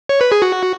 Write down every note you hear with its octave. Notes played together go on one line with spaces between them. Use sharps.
C#5
B4
G#4
F#4